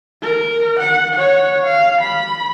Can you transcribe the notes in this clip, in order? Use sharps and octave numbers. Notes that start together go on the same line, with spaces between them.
A#4
F#5
C#5 F#5
F5
B5